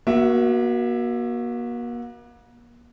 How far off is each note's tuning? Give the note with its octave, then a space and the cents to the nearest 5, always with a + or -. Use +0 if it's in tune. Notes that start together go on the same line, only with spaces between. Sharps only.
A#3 +40 F#4 +0 E5 +0